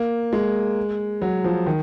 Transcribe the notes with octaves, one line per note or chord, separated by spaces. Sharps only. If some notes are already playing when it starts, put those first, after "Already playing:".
Already playing: A#3
G#3
F#3
F3
D#3